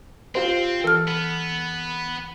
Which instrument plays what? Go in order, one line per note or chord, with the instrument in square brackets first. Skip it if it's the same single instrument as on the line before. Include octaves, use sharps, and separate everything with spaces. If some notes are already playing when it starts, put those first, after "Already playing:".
[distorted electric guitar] C4 [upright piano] F4 G4 C5
[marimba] E3 F6 [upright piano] A4
[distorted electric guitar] B3